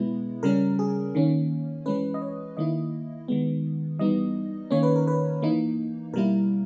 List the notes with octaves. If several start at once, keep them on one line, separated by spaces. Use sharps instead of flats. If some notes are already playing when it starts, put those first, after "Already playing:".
Already playing: B2 G#3 B3 E4
C#3 G3 C#4 A#4
G#4
D#3 A#3 C#4
E3 G#3 C#4 B4
D#5
C#5
D#3 A#3 E4 D#5
D#3 G#3 B3
E3 G3 B3 D#4 D#5
D#3 A#3 C#4 C#5
B4
A#4
B4
E3 A#3 D#4
B2 G3 A#3 E4 A#4